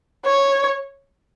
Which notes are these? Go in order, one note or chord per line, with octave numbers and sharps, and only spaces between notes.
C#5